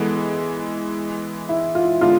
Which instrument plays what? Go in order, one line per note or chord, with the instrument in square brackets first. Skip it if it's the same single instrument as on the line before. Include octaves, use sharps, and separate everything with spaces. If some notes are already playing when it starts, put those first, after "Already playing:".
Already playing: [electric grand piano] E3 G#3 B3 [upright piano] A4
[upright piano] G#4
E4
F4
[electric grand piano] D3 G#3 B3 D4 [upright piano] F4